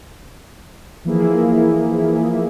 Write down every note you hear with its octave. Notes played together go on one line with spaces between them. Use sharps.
E3 F3 A#3 E4 G#4